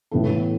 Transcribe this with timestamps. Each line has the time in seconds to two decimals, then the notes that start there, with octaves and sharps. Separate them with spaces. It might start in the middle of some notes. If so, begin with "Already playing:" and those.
0.11 A2 E3 B3 E4 A4